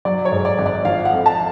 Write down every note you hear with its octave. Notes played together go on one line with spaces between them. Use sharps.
F#3 D5
C#5
G#2
D5
G#1
D5
F3 F5
F#5
F2
A5